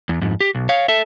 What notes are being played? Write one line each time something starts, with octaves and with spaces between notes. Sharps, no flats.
E2
F2 G#2
G4
B1
C#5 F5
A4 E5